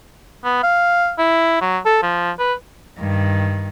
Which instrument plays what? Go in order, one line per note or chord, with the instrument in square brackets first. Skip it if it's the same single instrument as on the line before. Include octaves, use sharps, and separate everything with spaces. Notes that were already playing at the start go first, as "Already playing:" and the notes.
[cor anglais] B3
F5
E4
F#3
A4
F3
B4
[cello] G2 D#3